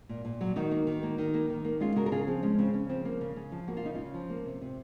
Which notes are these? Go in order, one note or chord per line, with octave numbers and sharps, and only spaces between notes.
A#2
A#2
F#3
D#3 D#4 F#4
A#3
D#3
A#3
D#3
A#3
D#3
A#3
G#3 C#4 F4
C#3 F#4 A#4
A#4
C#3 F4 G#4
F3 C4
G#3 C#4
C#3 C4
C#3 C#4
F3 C4
A#3 C#4
C#3
C#3 C#4
F3
A#3 F#4
F4
C#3 D#4
C#3 C#4 F4
F3
A#3
C3
C3